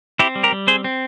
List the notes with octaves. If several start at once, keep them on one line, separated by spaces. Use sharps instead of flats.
C4 E4 G4
G3
G4 A#4
G3
C4 G#4 C5
C4